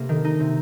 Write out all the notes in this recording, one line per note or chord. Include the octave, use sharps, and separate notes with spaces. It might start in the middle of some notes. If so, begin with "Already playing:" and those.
Already playing: C3 A#3
D#3
D#4
C3